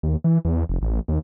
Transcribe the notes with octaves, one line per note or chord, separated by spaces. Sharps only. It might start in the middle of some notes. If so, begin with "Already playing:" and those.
D#2
E3
E2
F1
A1
D#2